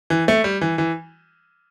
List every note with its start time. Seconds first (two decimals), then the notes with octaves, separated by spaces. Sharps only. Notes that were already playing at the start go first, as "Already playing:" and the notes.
0.10 E3
0.28 A3
0.44 G3
0.61 E3
0.78 E3